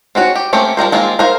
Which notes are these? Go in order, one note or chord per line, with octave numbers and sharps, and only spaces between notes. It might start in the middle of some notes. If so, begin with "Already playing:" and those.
C4 C#4 F#4 C#5
G4
A3 A#3 C4 C#4 G4
F3 G3 A#4 C5
D#3 G#3 A#3 C4 F4
A#4 C5 F5